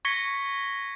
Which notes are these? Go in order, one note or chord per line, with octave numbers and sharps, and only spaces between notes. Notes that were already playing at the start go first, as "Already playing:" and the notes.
C#6 G#6 A#6 B6 C#7 G7